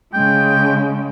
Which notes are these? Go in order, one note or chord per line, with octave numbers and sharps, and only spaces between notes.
C#3 G#3 G5